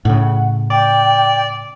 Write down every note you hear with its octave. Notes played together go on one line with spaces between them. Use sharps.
A2 C#3 F#5
D5 G5